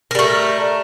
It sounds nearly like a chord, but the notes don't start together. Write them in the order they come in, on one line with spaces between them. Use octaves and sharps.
A#4 G3 A3